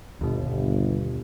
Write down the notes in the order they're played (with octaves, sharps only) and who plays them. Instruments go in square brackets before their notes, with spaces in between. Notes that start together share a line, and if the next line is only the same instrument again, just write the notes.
[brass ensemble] G1 [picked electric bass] D#2 B2